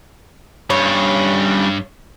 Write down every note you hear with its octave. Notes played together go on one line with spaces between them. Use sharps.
G2 G3 C#4 C#5